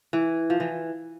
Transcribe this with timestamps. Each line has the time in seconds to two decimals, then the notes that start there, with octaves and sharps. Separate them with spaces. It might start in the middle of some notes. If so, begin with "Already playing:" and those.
0.13 E3
0.50 F3
0.60 E3